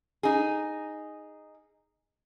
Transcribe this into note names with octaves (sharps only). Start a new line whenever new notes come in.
D#4 G#4